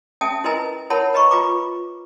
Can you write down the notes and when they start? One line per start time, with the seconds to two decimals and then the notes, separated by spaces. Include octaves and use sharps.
0.21 C#4 E5 G5 A5 D#6
0.44 E4 A#4 B4 D#5 G#5 A#5
0.90 E4 A#4 C#5 F#5 A5 B5
1.14 B4 D#5 A#5 B5 C#6
1.31 F4 B4 A#5 D6